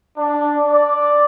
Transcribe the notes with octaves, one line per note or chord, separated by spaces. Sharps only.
D4
D5